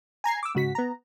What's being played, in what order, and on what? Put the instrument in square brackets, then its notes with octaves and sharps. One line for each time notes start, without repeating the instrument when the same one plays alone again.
[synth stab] G#5 A#5 G#6 C7
D6 E6
G#2 C#3 F#4 B6
B3 A#5